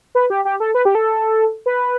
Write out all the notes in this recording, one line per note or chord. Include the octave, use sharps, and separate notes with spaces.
B4
G4
G4
A4
B4
G4
A4
B4